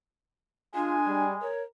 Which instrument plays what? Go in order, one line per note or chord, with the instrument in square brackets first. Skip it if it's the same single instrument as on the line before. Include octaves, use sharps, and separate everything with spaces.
[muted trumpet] G#3 [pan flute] D4 [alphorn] F4 [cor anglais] G#5
[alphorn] G3
[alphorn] A#4 [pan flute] C#5